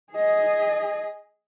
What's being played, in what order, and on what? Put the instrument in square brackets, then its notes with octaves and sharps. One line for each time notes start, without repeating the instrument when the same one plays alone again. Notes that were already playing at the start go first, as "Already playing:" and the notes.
[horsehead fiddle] G#4 D#5